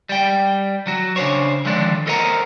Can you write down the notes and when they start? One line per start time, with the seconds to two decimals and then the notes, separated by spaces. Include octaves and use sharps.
0.09 G3 G5
0.87 F#3 F#4
1.16 C#3 D4 C5 C#5
1.65 D3 D#3 F3 G#3 D4
2.07 A4 A#4 C5 D#5 F#5 A#5